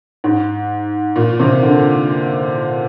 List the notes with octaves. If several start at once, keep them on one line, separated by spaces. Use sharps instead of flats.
G#2
A#2
C3
D3